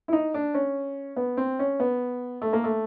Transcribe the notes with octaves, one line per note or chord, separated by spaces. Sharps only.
E4
D#4
D4
C#4
B3
C4
C#4
B3
A3
A#3
A3